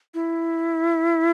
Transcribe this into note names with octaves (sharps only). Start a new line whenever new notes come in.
E4